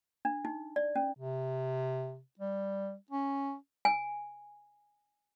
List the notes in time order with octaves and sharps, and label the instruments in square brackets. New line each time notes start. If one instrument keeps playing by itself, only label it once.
[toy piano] D4
D#4
D5
C#4
[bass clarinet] C3
G3
C#4
[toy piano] G#5